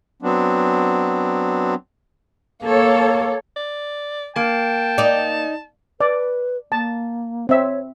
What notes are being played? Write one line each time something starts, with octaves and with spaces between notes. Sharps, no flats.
F#3 B3 C4 D4
A#3 A4 C#5
D5
A#3 G5 A5
D#4 D5
B4 D5
A#3 A5
C4 C#5 E5